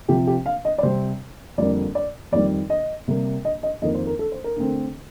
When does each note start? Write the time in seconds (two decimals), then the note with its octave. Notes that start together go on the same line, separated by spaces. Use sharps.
0.08 C3 F3 C4 G4
0.27 G4
0.46 F5
0.65 D#5
0.78 D5
0.83 C3 G3 C4 C5
1.58 F2 D3 G3 A#3 D5
1.95 D5
2.32 F2 D#3 G3 D5
2.70 D#5
3.08 C3 G3 A#3
3.45 D#5
3.63 D#5
3.82 F2 D#3 A#3 D#5
3.94 C5
4.07 A#4
4.19 A4
4.32 C5
4.44 A#4
4.57 D3 A3 C4